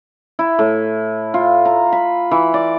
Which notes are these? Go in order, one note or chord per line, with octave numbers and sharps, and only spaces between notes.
E4
A2
F4
A#5
B5
E3
D5